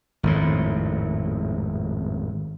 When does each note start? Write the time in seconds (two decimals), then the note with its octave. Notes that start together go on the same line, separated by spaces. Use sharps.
0.23 G#1 F2 A2